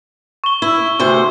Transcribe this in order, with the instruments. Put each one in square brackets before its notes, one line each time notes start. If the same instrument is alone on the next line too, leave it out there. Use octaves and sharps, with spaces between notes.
[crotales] C#6 G7
[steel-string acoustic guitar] E4
D2 C3 C5